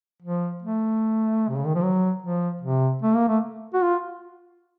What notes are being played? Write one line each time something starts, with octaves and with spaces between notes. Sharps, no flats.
F3
A3
C3
C#3
D#3
F3
F#3
F3
C3
A3
A#3
A3
F#4
F4